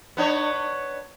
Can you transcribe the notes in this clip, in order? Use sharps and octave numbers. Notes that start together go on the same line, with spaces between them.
B3 D4 C#5